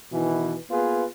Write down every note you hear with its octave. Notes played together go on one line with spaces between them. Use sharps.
B2 D#3 E3
A#3 B3 F4 G#4 B4